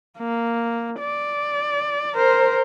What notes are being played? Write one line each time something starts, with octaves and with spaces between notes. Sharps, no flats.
A#3
D5
A#4 C5